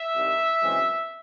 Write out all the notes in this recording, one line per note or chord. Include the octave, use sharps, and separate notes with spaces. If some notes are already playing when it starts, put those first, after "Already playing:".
Already playing: E5
C2 C3 D#3
F#2 C#3 E3 G#3 C4